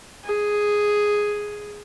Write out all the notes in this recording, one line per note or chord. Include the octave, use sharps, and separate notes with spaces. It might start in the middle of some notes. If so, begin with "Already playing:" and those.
G#4